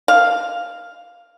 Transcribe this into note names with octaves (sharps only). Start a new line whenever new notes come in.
F5